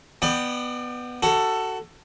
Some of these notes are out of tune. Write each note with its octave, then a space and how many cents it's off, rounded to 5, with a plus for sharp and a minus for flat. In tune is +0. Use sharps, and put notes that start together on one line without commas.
B3 +0 D5 +35 G5 +0
F#4 +20 A4 +15